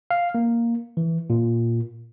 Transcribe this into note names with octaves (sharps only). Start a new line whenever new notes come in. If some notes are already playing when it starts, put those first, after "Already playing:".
F5
A#3
E3
A#2